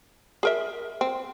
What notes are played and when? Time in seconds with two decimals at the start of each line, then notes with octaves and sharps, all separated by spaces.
0.43 G#4 A#4 E5
1.01 C4